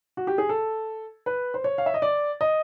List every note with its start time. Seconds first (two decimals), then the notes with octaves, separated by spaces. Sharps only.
0.17 F#4
0.27 G4
0.38 G#4
0.49 A4
1.26 B4
1.54 C5
1.64 C#5
1.78 F5
1.86 E5
1.94 D#5
2.02 D5
2.41 D#5